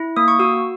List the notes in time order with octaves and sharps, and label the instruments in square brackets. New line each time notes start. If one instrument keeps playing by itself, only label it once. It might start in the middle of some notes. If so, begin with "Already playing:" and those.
Already playing: [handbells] E4
A#3 D#6
C#6
F#4 E6